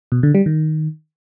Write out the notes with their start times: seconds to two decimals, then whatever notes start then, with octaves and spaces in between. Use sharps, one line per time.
0.12 B2
0.23 D3
0.35 G3
0.46 D#3